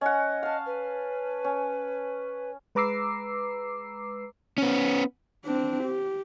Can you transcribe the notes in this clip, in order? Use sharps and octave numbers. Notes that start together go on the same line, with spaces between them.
C#4 D#5 F#5
F5 A5
B4
C#4
G#3 B4 A#5 D6 E6 C7
B3 C#4
C4 D4
G4